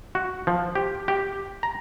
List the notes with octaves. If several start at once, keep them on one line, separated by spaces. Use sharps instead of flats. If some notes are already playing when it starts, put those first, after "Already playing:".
F#4
F3
G4
G4
A#5